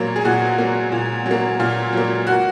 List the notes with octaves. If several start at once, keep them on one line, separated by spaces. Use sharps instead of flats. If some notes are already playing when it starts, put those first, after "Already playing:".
Already playing: A#2 F#3 A#3
G#4
A#2 F#4
F#3 A#3
A#2
F#3
A#3
A#2 F4
F#3 A#3
F#4